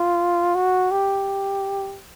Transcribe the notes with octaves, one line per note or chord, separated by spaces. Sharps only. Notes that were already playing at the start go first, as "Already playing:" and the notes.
Already playing: F4
F#4
G4